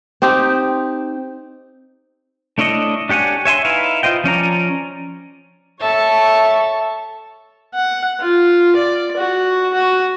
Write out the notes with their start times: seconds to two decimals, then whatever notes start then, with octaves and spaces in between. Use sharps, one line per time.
0.22 C4 D#4 G4
2.58 A3 D4 E4 C#5 D#5
3.09 D4 G4 C#5 F#5 G#5
3.45 C#5 E5 G#5 C6
3.65 D#4 E4 B4 F5
4.03 F4 C5 D#5 G5
4.24 F3 C#4 D5 A#5
5.80 A4 C#5 E5 A5
7.75 F#5
8.20 F4
8.76 D5
9.17 F#4
9.74 F#4